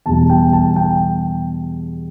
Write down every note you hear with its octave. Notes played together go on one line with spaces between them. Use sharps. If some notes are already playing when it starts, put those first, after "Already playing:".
E2 B2 G3 A5
G5
A5
G5